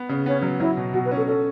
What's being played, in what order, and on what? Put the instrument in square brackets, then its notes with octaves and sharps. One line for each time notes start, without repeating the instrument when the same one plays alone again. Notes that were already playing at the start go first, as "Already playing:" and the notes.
Already playing: [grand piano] B3
C#3
[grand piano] B3 [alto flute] C#4
[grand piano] F#3
[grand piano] F#3 [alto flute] E4
[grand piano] B2
[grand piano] B2 [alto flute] F#4
[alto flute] B4
[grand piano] C#4
[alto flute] A4
[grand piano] C#4 [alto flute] A4